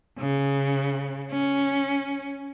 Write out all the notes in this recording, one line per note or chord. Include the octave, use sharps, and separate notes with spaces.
C#3
C#4